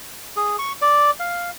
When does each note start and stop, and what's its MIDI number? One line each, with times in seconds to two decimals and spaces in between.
0.36 0.56 68
0.59 0.72 85
0.82 1.11 74
1.20 1.50 77